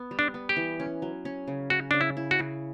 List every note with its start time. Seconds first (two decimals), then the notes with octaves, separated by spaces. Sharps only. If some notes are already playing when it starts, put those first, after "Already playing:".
Already playing: B3
0.11 G3
0.19 D4
0.34 B3
0.49 G4
0.56 E3
0.80 C#4
1.02 F#3
1.25 C#4
1.48 C#3
1.70 C#4 F#4
1.91 C#3 D4
2.01 E4
2.17 E4
2.31 F#4
2.39 C#3